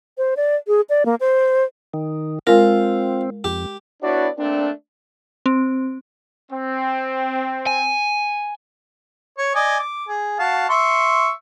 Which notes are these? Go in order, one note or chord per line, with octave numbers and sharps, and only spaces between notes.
C5
D5
G#4
D5
A#3
C5
D#3
G#3 C4 F4 A#4
F2 G4
B3 D4 E4 F#4 C#5 D5
A3 A#3 C4 D4
C4
C4
G#5
C#5
D5 D#5 G#5
D6
G#4
F#4 F5 A5
E5 C6 C#6